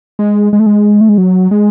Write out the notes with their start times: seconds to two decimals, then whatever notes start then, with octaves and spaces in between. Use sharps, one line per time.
0.19 G#3
0.53 G#3
0.60 A3
0.66 G#3
1.01 A3
1.09 G#3
1.18 F#3
1.51 G#3